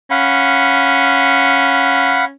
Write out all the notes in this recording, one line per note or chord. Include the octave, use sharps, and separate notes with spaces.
C#4 F5 F#5 B5